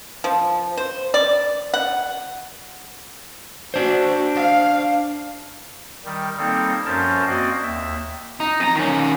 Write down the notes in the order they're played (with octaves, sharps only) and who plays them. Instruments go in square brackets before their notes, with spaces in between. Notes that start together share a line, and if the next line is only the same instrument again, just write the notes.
[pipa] F3
C5
D5
F#5
[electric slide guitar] D4 C5 [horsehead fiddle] F#4
[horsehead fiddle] F5
[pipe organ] D#3 G3
G3 A#3 C4 D#4 A4
F#2 F3 C#4 A#4 C5 A5
A#3 C4 F#4 C5 D5 D#5
D#2 E5
[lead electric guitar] D#4
F2 A#5
D#3 C#4